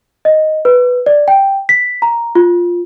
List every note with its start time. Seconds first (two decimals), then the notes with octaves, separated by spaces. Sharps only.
0.25 D#5
0.65 B4
1.06 D5
1.28 G5
1.69 B6
2.02 A#5
2.35 F4